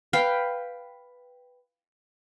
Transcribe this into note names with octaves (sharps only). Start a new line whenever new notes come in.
B4 F5 G5